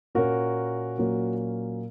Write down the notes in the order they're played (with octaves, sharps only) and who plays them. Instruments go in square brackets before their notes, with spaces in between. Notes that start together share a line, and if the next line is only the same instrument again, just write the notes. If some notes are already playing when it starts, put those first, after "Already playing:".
[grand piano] A#2 A#3 C#4 F#4 A#4
A#2 F#3 A#3 C#4